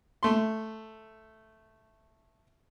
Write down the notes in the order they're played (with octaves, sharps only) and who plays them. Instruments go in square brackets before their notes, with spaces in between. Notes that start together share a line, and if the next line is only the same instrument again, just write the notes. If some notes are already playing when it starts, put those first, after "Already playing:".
[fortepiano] A3 C6